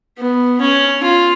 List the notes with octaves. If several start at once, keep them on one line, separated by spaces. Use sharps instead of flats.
B3
C#4
F4